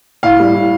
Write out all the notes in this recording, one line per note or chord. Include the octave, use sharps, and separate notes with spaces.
A2 F5
G3
A2